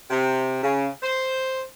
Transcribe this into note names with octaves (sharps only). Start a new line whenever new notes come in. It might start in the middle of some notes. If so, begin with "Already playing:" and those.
C3
C#3
C5